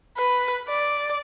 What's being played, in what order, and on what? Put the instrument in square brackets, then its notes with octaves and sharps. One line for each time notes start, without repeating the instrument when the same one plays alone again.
[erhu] B4
D5